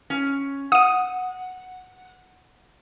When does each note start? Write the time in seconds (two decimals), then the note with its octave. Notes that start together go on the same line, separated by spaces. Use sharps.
0.10 C#4
0.72 F#5 D#6 D#7